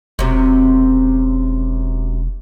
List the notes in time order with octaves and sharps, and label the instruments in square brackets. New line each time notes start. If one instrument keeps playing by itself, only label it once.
[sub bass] E1 [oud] F#2 C3